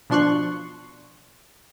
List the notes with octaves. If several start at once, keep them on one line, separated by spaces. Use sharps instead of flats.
B2 F3 D4 C6 C#6 F#6